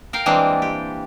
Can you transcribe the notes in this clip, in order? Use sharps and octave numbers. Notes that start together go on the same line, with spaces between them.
A#4 F5 G5
E3 G3 G#3 A#3 C4 D4
G4